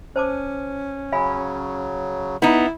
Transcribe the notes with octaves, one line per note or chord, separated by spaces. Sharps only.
C#4 C5 A5 D6
C#3 F#3 F5 G#5 B5
B3 D#4 E4